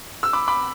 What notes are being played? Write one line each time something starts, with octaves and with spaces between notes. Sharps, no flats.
E6
B5 D6
B5 D6